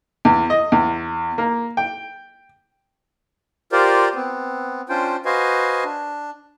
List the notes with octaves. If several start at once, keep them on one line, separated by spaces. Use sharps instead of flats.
E2
D#5
E2
A#3
G5
F4 G4 A#4 C5 D5
B3 C4
C#4 D4 F4 C5 G5
F#4 B4 C5 D#5 F5 G#5
D4